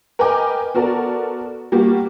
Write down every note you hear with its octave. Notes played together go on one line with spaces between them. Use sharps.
A#4 B4 D#5 G5 G#5 D6
B3 F#4 A4 A#4 D5
G3 A#3 F#4 G4